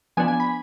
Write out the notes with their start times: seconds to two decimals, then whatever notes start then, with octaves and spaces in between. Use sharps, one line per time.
0.17 F3 B3 D4 G#5
0.28 G#5
0.40 B5